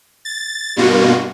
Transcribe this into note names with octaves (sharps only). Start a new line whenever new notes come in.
A6
G2 B2 A#3 F4 F#4